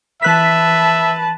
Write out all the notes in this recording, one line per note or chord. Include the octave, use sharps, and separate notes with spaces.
E3 B4 E5 A5 F#6 B6